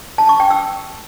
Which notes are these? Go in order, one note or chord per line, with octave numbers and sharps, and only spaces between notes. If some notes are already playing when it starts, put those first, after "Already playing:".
A5
C#6
G5
E6